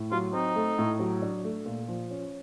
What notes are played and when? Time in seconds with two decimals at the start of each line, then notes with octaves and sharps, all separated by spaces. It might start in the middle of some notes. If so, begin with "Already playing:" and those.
Already playing: A2
0.12 F#3 F4
0.33 C4 D#4
0.56 A3
0.79 A2
0.99 F#3
1.22 D4
1.44 A3
1.66 A#2
1.88 F3
2.11 C#4